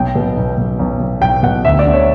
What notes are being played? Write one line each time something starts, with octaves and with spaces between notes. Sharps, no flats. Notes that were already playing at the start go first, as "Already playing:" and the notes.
Already playing: B1 G5
B2
B1
B2
B1
B2
B1 G5
B2 F#5
D2 E5
D5
D3
C#5